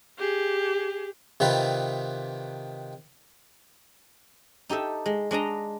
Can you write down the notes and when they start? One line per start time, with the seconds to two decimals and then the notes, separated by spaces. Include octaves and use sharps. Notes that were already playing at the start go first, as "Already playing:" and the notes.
0.18 G4 G#4
1.40 C3 D#3 F4 B4
4.69 D#4 G4 A4 E5
5.06 G#3
5.31 G#3 D4 D#5 A#5